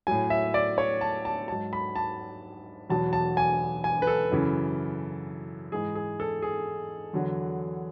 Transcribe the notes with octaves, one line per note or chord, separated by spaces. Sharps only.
A2 F#3 G#5
E5
D5
C#5
A5
A5
G#2 F#3 A5
B5
A5
E2 B2 F#3 A5
A5
G#5
G#5
B4
A4
F#2 C#3 E3
G#2 E3 G#4
G#4
A4
G#4
E2 D3 F#3